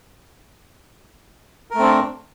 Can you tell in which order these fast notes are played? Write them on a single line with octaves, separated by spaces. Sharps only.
A#4 A3 C4 D4